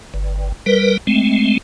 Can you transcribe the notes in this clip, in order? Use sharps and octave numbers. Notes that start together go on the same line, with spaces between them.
G1
G3 A#4 B4
G#3 A3 C4